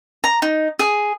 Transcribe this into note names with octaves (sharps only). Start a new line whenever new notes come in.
A#5
D#4
G#4